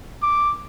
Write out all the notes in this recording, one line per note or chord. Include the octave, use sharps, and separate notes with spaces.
D6